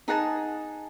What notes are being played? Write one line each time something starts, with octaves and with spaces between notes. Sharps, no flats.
D#4 G#4 F#5 A5